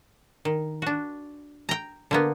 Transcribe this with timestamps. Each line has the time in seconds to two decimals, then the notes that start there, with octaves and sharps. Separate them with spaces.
0.45 D#3
0.82 D4 F#4
1.69 G5 A#5
2.11 D3 A#3 B3